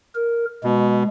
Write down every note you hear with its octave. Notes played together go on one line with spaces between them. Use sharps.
A#4
B2 G#3